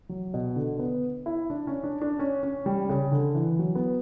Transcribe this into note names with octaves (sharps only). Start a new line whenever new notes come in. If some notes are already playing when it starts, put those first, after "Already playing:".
F#3
B2
D3
B3
E4
D4
C#4
D4
D4
C#4
C#4
G3
C#3
D3
E3
F#3
B3